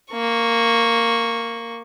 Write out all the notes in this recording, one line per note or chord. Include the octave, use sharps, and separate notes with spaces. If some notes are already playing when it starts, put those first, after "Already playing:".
A#3 C#6